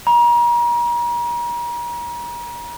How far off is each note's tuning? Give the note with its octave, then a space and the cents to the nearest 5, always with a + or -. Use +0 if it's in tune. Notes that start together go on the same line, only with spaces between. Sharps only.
A#5 +35